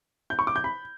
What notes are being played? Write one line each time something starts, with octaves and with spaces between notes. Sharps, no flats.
G6
C#6
D6
G6
B5